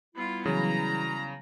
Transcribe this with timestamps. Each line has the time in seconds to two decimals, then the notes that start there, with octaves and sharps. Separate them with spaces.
0.15 G3 B3 E4 F4
0.46 C#3 E3 F#3 B3 A#5